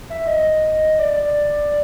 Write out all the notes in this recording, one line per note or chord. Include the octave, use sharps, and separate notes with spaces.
E5
D#5
D5